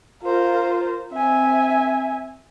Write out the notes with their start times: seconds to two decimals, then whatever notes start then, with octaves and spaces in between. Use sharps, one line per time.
0.23 F4 A#4 C5
1.13 C4 E5 G#5